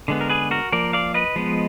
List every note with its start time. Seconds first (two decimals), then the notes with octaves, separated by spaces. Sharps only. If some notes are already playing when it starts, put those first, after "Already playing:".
0.08 D3 G#3 B3
0.21 A#4
0.29 G#4 B4
0.51 F#4 A#4
0.72 F3 A#3 A#4 D5
0.93 D5 F5
1.14 B4 D#5
1.36 F3 G#3 B3